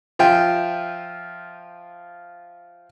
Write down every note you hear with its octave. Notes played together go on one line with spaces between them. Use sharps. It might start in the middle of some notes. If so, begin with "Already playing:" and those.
F3 F4 E5 G5